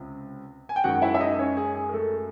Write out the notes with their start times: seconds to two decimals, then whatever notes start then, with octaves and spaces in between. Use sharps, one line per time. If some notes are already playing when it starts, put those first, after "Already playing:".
Already playing: C#2 C3
0.69 G#5
0.76 G5
0.84 F#2 D#3 G#3 F#4 F#5
1.02 E4 E5
1.15 E5
1.20 D#4 D#5
1.39 C#4 C#5
1.57 G#4
1.75 G#4
1.89 A#4
1.94 A3 A4